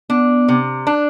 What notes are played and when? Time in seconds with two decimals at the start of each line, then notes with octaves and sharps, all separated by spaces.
0.09 B3 D4
0.49 C3
0.87 D4